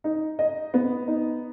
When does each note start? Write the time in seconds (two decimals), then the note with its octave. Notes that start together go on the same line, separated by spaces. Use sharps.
0.04 D#4
0.39 D#5
0.74 B3
1.08 D#4